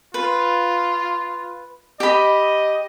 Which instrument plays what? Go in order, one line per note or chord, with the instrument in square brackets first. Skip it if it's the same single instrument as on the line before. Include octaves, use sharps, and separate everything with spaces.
[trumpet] F4 [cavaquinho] B4
[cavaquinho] G4 B5 [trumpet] D#5